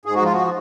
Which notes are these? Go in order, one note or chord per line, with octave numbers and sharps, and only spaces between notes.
G#2 G#4
F#4
F3 F4
F#4